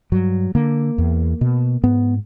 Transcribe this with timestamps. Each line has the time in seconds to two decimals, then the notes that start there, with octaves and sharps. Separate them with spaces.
0.12 G2 F#3
0.55 D3 A#3
0.98 E2
1.41 B2
1.83 G#2 B3